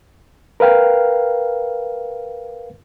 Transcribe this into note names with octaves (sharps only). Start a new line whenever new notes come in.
A#4 B4 F5 G5